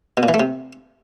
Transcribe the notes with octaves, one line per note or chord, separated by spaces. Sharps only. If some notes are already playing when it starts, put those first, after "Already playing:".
B2
A#2
E3
A3
C3